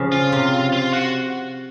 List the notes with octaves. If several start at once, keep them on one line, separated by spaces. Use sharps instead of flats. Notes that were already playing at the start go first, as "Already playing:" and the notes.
Already playing: C#3 F3
F4
C3
F4
F#4